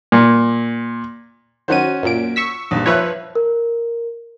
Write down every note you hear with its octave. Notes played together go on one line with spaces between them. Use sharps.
A#2
D#3 F#3 C#4 F#4 C5 D#7
F#2 A#2 D7
C#6 E6 B6
A#1 G2
F3 B4 C#5 E5 F#6
A#4